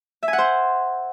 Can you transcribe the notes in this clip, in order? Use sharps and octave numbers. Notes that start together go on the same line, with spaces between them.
E5
G#5
F#5
C5